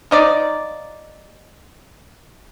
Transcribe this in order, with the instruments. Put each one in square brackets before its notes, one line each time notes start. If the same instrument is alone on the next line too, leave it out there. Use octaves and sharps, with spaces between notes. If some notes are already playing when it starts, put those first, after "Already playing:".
[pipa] F3 D#4 D5